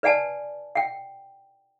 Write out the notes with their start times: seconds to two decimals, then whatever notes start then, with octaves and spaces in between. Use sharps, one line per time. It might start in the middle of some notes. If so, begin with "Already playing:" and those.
0.03 B4 D5 F#5 G#5 A5
0.75 F#5 G5